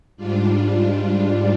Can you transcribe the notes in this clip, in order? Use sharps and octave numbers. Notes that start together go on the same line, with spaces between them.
G#2 G3 D4 F4